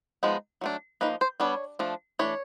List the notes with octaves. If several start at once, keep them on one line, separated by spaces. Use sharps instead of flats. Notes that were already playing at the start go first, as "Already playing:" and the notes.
F3 G#3 B3 D#4
F#3 A3 D4
F3 A#3 D#4 B4
C5
G3 B3 D4 C#5
F3 A3 D4
E3 A3 D4 C#5